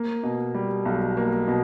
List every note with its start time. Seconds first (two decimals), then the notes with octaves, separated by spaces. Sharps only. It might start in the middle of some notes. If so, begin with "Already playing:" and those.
Already playing: A#3
0.23 B2
0.55 G3
0.85 B1
1.17 A#3
1.48 B2